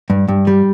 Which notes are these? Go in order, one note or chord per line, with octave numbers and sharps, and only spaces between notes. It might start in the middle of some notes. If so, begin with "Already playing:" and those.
G2
G2
G3